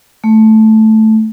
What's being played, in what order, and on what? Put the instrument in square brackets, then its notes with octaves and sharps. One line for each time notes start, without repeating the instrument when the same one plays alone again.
[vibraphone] A3